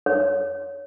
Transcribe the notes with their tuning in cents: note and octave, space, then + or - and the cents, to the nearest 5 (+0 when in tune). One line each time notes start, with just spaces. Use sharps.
C#5 +15